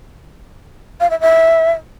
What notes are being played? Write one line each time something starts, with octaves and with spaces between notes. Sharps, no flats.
F5
E5
E5